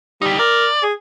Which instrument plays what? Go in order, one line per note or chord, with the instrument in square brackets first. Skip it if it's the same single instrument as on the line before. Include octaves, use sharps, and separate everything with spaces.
[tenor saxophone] G3 [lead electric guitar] D#4 G4
[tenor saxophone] A#4 [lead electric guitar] D5
[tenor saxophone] G#4